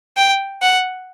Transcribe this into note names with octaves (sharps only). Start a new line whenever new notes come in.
G5
F#5